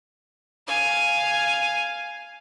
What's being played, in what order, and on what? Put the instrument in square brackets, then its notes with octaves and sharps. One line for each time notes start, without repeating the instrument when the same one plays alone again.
[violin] F5 G#5